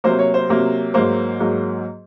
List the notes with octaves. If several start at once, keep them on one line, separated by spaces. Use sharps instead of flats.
C3 F#3 A#3 C5
C#5
C5
C3 F#3 A#3
G#2 F#3 A#3 C5
G#2 F#3 A#3